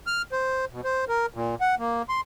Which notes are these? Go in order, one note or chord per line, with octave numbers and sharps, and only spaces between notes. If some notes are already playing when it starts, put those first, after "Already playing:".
F6
C5
B2
C5
A#4
A#2
F#5
A#3
C6